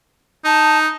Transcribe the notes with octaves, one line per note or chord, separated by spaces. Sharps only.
D#4 A5